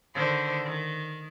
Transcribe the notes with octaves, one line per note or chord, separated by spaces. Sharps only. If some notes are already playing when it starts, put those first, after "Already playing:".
D3 D#3 C5
D#3